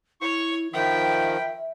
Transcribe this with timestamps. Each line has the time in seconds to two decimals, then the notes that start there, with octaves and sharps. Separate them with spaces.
0.21 E4 C#5 C#6
0.73 D#3 F3 E5 G5 B5